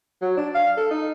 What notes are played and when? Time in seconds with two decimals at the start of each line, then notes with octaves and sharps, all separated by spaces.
0.22 F#3
0.37 D4
0.54 F5
0.77 A4
0.90 D#4